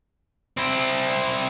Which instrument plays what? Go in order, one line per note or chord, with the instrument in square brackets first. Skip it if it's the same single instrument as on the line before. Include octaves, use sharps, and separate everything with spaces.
[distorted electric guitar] C4 E4